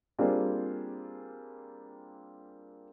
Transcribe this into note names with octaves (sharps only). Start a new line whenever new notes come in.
G3 A#3 C4 D4 F4 G#4